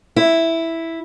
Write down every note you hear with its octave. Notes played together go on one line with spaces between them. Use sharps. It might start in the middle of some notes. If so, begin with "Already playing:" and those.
E4